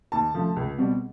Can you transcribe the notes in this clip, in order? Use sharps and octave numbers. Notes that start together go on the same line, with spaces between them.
D#2 A5
C#3 F3 A3
C#2
B2 G3 C4